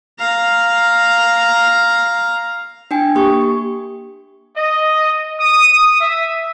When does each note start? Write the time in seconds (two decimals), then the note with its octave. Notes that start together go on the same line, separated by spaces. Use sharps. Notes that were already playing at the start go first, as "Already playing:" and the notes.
0.19 F5 A#5
2.91 D4 G5 G#5
3.15 A#3 G4 C#6
4.55 D#5
5.39 D#6
6.00 E5